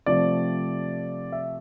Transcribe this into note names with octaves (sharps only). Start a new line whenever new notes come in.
C3 F3 A3 C4 D5
E5